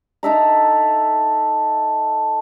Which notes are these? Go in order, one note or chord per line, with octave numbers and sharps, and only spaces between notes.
D#4 A4 E5 A#5